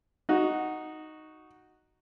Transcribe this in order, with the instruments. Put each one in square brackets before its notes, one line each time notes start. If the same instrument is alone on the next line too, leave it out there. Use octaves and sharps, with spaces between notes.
[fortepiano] D#4 F#4